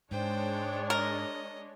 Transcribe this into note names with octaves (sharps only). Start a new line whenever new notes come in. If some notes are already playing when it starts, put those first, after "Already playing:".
G#2 G#3 D4 C5 C#5 G5
A#4 D#5